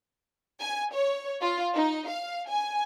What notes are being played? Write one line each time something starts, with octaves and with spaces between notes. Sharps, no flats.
G#5
C#5
F4
D#4
F5
G#5